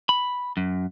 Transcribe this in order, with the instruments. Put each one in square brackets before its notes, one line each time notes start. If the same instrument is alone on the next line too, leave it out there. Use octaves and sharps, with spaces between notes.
[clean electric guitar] B5
F#2